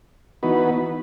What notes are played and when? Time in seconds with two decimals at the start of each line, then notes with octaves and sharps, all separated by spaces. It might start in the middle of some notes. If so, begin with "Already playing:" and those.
0.43 E3 B3 D#4 F#4 B4